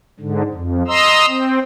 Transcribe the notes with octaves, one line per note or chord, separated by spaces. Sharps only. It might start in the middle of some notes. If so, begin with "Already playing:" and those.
G#2 D3
F2
D#5 A#5 C6 E6
C4